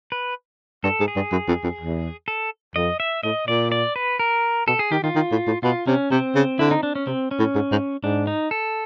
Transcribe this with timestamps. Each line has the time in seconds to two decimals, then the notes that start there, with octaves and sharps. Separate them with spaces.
0.12 B4
0.84 G2 A4
1.00 G#2
1.08 G#4
1.16 G2
1.32 F#2
1.48 F2
1.64 F2
1.80 E2
2.28 A4
2.76 F2 D#5
3.00 E5
3.23 A2 D#5
3.48 A#2 D5
3.72 D5
3.96 B4
4.19 A#4
4.68 B2 A4
4.79 G#4
4.92 D#3 G4
5.04 D#3 F4
5.15 D#3
5.32 A2
5.47 A2
5.63 B2 F4
5.87 C3 C#4
6.11 C3 C4
6.35 C#3
6.59 D3 E4
6.71 D#4
6.83 D4
6.95 C#4
7.07 C3 C4
7.31 C#4
7.39 A2
7.55 G#2
7.71 G#2
8.03 G#2 D4
8.27 D#4
8.51 A4